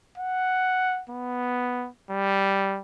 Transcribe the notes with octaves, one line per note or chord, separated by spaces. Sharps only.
F#5
B3
G3